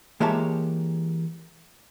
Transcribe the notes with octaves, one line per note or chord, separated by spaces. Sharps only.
E3 G#3 A#3 G4 C#5 A5